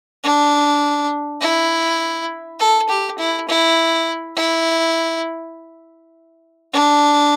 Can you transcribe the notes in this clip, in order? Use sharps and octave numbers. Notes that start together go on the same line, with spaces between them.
D4
E4
A4
G4
E4
E4
E4
D4